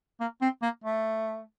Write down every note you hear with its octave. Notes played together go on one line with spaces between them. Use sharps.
A#3
C4
A#3
A3